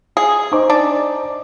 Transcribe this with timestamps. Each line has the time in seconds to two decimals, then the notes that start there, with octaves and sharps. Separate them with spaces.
0.17 G#4
0.52 D#4 C5 D6
0.70 D4